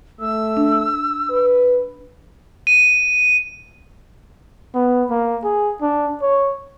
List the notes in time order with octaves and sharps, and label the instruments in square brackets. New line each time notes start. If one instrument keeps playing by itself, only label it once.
[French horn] A3 [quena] E6
[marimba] D4
[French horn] B4
[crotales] D#7
[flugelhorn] B3
A#3
G#4
D4
C#5